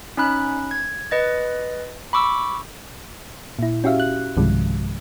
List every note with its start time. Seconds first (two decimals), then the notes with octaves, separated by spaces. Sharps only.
0.17 C#4 D#4 B5 F#6
0.71 G#6
1.11 B4 D#5 A6
2.13 B5 C#6 D6 E6
3.59 A#2 E4
3.84 C#4 F#4 G4 E5 F5
4.00 F#6
4.37 B1 G2 C3 D#3 F3 G#3